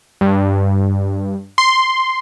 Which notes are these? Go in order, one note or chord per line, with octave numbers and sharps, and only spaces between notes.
G2
C6